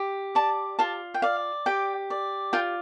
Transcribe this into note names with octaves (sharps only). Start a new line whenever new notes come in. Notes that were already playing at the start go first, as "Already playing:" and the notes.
Already playing: G4
D5 A5
F4 A5
G5
D5 F5
G4 G5
D5
F4 G5